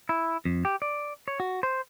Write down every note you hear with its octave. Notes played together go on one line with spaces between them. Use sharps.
E4
F2
G4
D5
C#5
F#4
C5